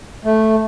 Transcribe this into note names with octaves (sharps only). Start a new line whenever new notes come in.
A3